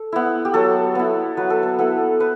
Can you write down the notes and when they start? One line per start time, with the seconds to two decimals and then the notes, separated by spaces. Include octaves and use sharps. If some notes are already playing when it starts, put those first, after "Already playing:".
Already playing: A4
0.12 B3 E4
0.45 G4
0.54 F#3 A4
0.95 B3 E4
1.37 F#3 B4
1.50 A4
1.63 B4
1.79 B3 E4 A4
2.20 B4